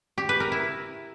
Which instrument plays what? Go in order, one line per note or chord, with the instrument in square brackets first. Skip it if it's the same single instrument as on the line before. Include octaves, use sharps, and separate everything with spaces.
[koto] G4
B4
A#4
E4